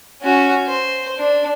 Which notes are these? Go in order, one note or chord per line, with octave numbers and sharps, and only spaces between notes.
C#4 F#4
C5
D4